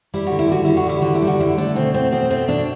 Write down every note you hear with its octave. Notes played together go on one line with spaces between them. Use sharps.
G3 E4
D3 F#4
E4
G3 F#4
D3 E4
F#4
G3 E4
D3 F#4
E4
G3
F#4
D3 E4
A3 D4
B2 C4
A3 C4
B2 C4
A3 C4
B2 D4